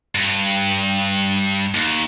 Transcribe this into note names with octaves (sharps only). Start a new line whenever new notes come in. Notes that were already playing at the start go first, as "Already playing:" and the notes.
G2
D#2